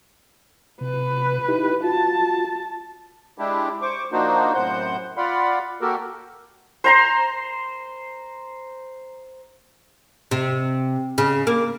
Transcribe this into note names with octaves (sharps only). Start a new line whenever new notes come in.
C3 B4
D#4 E4 G4
F4 F#4 A5
G#3 D4 E4 G4
C5 C#6 D6
F3 A#3 D4 D#4 F#4 C5
F#2 A2 C3 C5 F#5 G6
F4 D5 F5 F#5 B5
A#3 F#4 G4 A4 A#4
C5 A#5 C6
C3
C#3
A#3